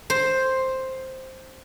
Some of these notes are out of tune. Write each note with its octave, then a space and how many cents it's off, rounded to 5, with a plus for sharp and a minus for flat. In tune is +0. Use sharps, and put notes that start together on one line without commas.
C5 +5